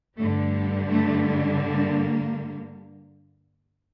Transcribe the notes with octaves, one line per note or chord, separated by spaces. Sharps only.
G2 D3 G3 A3
A3
A#3